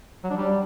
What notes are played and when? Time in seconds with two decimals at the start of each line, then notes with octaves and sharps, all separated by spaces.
0.24 F#3
0.30 D4
0.36 G3